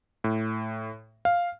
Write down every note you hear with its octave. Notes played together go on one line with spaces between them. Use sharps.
A2
F5